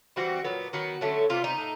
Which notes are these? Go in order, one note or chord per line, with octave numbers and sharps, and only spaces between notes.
E3 G3 C4 F#4
A#2 F#3 B3
D#3 F#3 B3 F#4
D3 F#3 A3 C#4
C3 E3 G3 B3 F4
D#4
A2